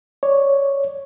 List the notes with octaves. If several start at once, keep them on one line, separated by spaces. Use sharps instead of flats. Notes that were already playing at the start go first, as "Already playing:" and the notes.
C#5 D5